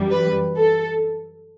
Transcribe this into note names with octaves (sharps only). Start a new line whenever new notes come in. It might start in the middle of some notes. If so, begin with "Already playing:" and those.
Already playing: F#2 E3 G3
B4
A4